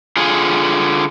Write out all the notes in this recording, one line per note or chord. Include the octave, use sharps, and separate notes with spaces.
D3 F4 G#4